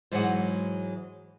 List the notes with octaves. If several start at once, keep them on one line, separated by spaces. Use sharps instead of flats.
G#2 E3 F#3 G#3 F#5